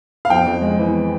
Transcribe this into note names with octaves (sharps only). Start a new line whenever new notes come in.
F5
F2 G5
F2
G#3
E3